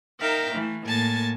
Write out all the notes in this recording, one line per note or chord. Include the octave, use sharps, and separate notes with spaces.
D#4 A#4 E5 F5 G5 A#5
E3 A3
A2 A#3 A4 G#5 A5 A6